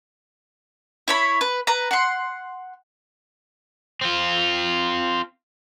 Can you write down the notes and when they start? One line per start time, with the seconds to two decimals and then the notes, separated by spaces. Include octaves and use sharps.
1.08 E4 C#5 B5
1.41 B4
1.67 B4 A#5
1.91 F#5 C6
4.01 C4 F4